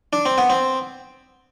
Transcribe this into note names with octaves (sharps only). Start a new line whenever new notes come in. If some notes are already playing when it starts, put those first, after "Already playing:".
D4
C4
B3
C4